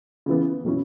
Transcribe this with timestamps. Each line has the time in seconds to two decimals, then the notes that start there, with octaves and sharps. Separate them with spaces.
0.26 C#3 E3 B3
0.65 B2 F#3 C#4 E4